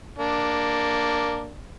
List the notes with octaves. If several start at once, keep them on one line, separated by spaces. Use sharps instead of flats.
A#3 D4